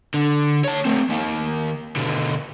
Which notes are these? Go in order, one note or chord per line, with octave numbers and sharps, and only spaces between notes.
D3
C#5 A5
A3 C4
D#3 A#3
B2 D3